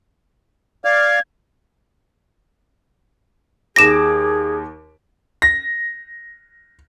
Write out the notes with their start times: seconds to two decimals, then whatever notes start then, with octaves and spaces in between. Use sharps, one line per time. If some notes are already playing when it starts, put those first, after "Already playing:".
0.85 D5 F5 G#6
3.76 D#2 G#4 D6 A#6 D7 E7
5.42 A#6